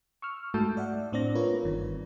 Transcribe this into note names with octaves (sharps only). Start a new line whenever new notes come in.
C#6 E6 F6
G#2 A3 F#4 A5 E6 G6
D5 E5 F#5
A2 C4 D4 D5 A#6
C4 F4 A#4 B4 C#5
G1 G2 D#3